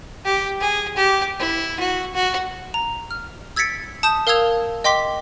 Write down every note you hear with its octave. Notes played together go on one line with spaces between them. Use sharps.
G4
G#4
G4
E4
F#4
F#4
A#5
F6
E6 G#6 A6 B6 C#7 D7
A5 D#6 G6 E7
A#4 F5 D#6 E6 G#6 F7
D#5 G5 C6 D6 B6